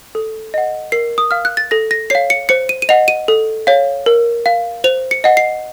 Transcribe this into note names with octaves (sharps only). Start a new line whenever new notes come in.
A4
D#5 F#5
A#4 C7
D#6
F5 F6
F#6
A6
A4 A#6
A#6
C#5 F5 C7
C#7
C5 C#7
D#7
D#7
D#5 F#5 F7
D#7
A4
C#5 F5
A#4
F5
C5 F7
C#7
D#5 F#5
C7